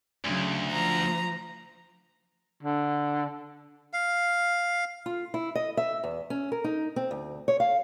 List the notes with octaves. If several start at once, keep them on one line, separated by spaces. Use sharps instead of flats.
D2 C#3 F#3
F3 A#5
D3
F5
F4
E4
D#5
E5
E2
C#4
A#4
D#4
C4
D2
C#5
F5